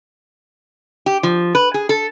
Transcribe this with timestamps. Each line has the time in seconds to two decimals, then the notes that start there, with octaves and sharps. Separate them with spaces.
1.06 G4
1.23 F3
1.55 B4
1.74 G#4
1.89 A4